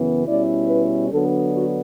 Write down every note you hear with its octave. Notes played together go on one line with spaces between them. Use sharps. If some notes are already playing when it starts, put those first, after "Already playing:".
Already playing: F#2 C#3 E3 B3
B2 G3 C#4 E4 D5
B4
D3 F#3 B3 D4 A4
F#4